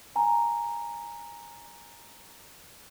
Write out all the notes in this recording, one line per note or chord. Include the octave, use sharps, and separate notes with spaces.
G#5 A#5